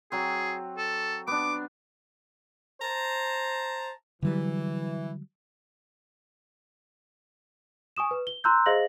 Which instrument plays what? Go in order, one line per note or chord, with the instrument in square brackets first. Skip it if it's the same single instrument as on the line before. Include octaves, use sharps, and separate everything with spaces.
[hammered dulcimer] F#3 C4 [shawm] G#4
[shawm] A4
[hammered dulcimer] B3 D4 [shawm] D6
[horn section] C5 A5 A#5
[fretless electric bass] D3 F#3 G3 [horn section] E3
[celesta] G#5 C#6 D#6 E7
B4
G7
A#5 C6 E6 F#6 G6
G#4 C5 D#5 F5 A#6 F#7